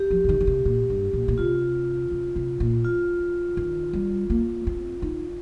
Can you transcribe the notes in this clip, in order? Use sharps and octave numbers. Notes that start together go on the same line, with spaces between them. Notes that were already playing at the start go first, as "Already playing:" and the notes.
Already playing: G4
F3
C3
D#3
D#3
C3
A#2
G2
A#2
A#2
C3 F4
C3
C3
A#2
F4
D#3
G3
A#3
C4
D#4